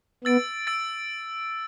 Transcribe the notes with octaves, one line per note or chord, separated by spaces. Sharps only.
B3 E6 A6 D7
E6 A6 D7